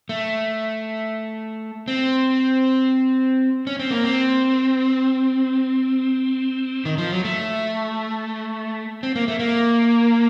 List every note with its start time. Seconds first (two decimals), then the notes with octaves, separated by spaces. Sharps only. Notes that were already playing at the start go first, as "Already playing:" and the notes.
0.09 A3
1.88 C4
3.67 C#4
3.79 C4
3.91 A#3
4.04 C4
6.85 D#3
6.98 F3
7.11 F#3
7.25 A3
9.03 C4
9.16 A#3
9.28 A3
9.39 A#3